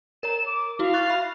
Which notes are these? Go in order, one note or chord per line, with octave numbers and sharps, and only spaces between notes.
A#4 C#5 A#5 E7
D6
E4 F#4 F5
C#6 F#6 A6
E5 B5